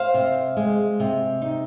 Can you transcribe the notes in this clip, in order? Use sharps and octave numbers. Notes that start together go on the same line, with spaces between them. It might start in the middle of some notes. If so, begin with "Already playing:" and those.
Already playing: C5 F5
C3
G#3
C3
D#4